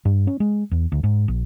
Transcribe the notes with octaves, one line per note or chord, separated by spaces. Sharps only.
G2
C#4
G#3
E2
D2
G#2
A#1